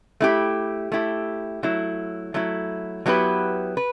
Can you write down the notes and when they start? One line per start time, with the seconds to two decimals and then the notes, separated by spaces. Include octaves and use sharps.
0.20 A3 E4 G4
0.92 A3 E4 G4
1.63 F#3 A3 E4
2.34 F#3 A3 E4
3.06 F#3 B3 E4 G4 B4
3.77 B4